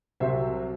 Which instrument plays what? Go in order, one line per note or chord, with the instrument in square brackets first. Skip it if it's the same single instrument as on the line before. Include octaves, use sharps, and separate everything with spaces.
[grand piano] C2 C3 F#3 C5 E5